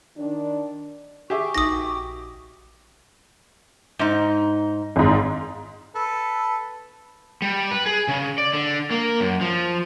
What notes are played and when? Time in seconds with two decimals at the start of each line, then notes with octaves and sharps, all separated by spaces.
0.17 D#3 D4
1.30 G4 G#4 E5 G5 C#6 D6
1.54 A#1 D#4 F#4 D#6 A#6
3.99 G#2 D#4
4.96 G#1 G#2
5.95 A4 B4
7.42 G3
7.71 B4
7.86 G#4
8.08 C#3
8.38 D5
8.53 D3
8.90 A#3
9.20 F#2
9.41 F3